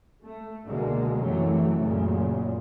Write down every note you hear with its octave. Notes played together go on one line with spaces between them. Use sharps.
A3
C#2 B2 D3 G#3 A#3
F#2 C3 E3 F#3 A3
C#2 F#2 A#2 C#3